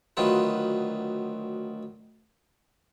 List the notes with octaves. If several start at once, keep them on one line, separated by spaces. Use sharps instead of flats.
D2 D#3 F#3 F4 B4